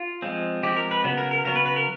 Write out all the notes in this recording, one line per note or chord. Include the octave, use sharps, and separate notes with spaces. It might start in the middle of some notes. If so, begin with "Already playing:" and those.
Already playing: F4
F3 G#3 C4
F3 G#3 C4 G4
A#4
B4
C#3 F#3 B3
A#4
A#4
C#3 F#3 B3 A#4
B4
B4
A#4